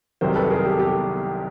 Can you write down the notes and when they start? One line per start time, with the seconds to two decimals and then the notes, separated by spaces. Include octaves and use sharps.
0.21 C2 C3 D#3 F#3 A#4 C5
0.35 A4 B4
0.50 G#4 A#4
0.65 G4 A4
0.79 G4 A4